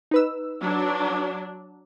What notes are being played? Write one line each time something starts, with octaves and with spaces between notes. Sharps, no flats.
D#4 B4 E6
F#3 D4